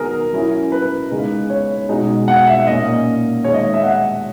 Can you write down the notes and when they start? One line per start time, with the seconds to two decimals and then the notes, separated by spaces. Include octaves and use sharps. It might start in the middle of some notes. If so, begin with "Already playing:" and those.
Already playing: D#3 F#3 B3 G#4 A#4
0.33 F#3 C#4 E4
0.72 B4
1.11 C#3 G#3 B3 D#4
1.50 C#5
1.89 B2 G#3 D#4
2.28 F#5
2.47 E5
2.67 A#2 A#3 C#4 D#5
3.44 D#3 G#3 D#4 C#5
3.54 D#5
3.74 E5
3.83 F#5